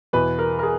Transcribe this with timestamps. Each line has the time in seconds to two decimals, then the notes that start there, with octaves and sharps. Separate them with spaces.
0.13 E2 B2 B4
0.39 A#4
0.59 A#4
0.63 G#4